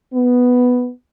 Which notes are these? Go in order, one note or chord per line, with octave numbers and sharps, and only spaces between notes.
B3